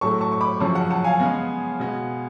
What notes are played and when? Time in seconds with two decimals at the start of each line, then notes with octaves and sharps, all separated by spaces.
0.01 A2 F#3 A3 A5 C#6
0.21 A5 C#6
0.32 C#6
0.41 B5 D6
0.60 F#2 C#3 F3 A5 C#6
0.75 F#5 A5
0.90 F#5 A5
1.04 F5 G#5
1.20 C#3 G#3 B3
1.79 B2 G#3 B3